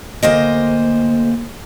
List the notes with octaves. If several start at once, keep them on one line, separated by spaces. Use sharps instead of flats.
D2 A#3 C5 D#5